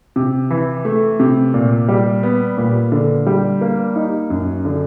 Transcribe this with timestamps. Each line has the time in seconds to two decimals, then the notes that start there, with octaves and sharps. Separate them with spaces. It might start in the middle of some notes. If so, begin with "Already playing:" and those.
0.16 C3
0.50 E3
0.85 A3
1.20 C3
1.54 A#2
1.88 G3
2.23 B3
2.58 A#2
2.92 D3
3.26 G3
3.61 A#3
3.96 D#4
4.30 F#2
4.65 D3